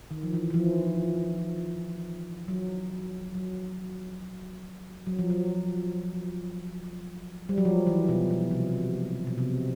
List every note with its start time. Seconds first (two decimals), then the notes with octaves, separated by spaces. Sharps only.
0.11 D#3
0.23 F3
0.33 E3
0.50 E3
0.54 F3
2.48 F#3
3.35 F#3
5.07 F#3
5.19 F3
5.30 F#3
7.49 G3
7.58 F#3
7.65 F3
7.87 E3
8.09 B2
8.31 B2
8.51 C3
9.27 B2
9.38 C3